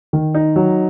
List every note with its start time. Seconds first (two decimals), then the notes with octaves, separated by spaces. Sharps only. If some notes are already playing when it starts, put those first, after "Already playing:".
0.13 D#3
0.34 D#4
0.56 F#3